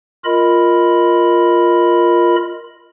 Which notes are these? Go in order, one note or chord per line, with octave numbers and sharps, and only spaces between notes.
F4 A#4 D#5 B5